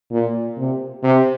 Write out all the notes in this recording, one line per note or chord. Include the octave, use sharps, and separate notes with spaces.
A#2
C3
C3